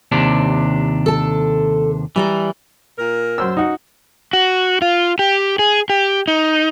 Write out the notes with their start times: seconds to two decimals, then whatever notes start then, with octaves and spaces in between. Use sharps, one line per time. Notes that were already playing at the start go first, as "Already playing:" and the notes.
0.12 D#2 C3 D4
1.06 A4 A5
2.16 E3 G3 D5 A#5
2.98 A#2 A#4
3.38 F#2 C5 E6
3.57 D#4 F#4
4.33 F#4
4.82 F4
5.19 G4
5.59 G#4
5.90 G4
6.28 D#4